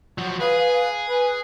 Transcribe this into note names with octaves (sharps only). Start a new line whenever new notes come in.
F3 F#3 F#5
G#4 B4 F5
B4 G#5